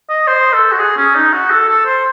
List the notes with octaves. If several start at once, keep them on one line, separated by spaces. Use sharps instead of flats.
D#5
C5
A4
F#4
G#4
C#4
D#4
F#4
A4
A4
C5